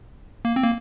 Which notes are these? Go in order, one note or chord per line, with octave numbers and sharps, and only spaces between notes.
A#3
C4
A#3